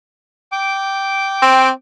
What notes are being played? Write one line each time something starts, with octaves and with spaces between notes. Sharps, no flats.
G5 D6
C4